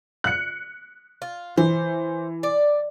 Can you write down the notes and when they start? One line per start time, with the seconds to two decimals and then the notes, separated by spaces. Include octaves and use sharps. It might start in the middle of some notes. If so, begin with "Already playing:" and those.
0.24 F#6 C#7
1.22 F4
1.57 E3 C5
2.43 D5